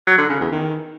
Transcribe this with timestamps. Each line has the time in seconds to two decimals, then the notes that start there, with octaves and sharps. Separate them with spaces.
0.07 F#3
0.18 D3
0.29 C#3
0.41 E2
0.52 D#3